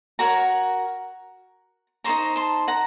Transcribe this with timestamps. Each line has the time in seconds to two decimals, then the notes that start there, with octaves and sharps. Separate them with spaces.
0.19 F#4 A#4 C#5 F#5 A#5
2.04 D#4 A4 C5 A#5 C#6
2.36 A5 C6
2.68 F#5 A#5